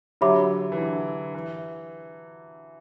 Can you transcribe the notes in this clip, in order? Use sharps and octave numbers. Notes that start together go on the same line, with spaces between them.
D3 F#3 G4 C#5 E5 B5 D6
E3
D3
E3